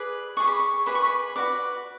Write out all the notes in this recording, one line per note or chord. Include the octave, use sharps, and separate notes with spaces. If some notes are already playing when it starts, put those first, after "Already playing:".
Already playing: G#4 B4 D5
G#4 D5 C#6
B5
C#6
G#4 B4 D5 B5
C#6
B5
F#4 B4 D5